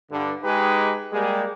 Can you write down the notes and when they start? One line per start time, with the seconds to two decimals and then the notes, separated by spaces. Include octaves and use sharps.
0.10 G2 D3
0.44 G#3 D#4 G4 G#4 B4
1.13 G3 G#3 A#3 G4 G#4